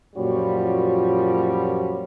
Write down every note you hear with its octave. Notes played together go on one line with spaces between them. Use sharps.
F#2 A#2 F3 G3 F#4 C#5